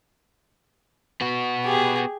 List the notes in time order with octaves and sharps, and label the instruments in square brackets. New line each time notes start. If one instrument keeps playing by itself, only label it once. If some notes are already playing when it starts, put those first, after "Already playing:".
[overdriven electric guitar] B3 F#4
[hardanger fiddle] G4 G#4